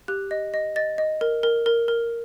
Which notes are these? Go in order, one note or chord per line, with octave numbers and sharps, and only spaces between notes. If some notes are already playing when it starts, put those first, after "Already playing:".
G4 F#6
D#5
D#5
D#5 A6
D#5
A#4
A#4
A#4
A#4